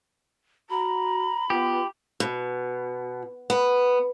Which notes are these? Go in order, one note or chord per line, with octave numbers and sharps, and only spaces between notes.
F#4 A#5 B5
B3 F4 G4
B2
B3